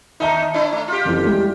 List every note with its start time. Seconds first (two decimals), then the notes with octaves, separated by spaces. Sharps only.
0.20 D#2 D#4 E5 A5 A#5
0.54 D4 E4 C#5
0.73 A3
0.88 F4 G4
1.05 F#1 F2 E3
1.24 G3 G#3 E4